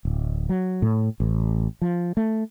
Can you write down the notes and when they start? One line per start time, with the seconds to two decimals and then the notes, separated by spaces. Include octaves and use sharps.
0.05 D1
0.49 F#3
0.82 A2
1.20 A1
1.82 F3
2.17 A3